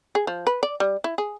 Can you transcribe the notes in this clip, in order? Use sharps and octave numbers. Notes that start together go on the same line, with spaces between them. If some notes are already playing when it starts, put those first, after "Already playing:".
G#4
F3
B4
D5
G3
E4
G#4